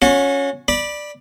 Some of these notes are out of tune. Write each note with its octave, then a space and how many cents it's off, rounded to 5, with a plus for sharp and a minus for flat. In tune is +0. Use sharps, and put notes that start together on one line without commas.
C#4 +0 F#4 -35
D5 +10 B5 -15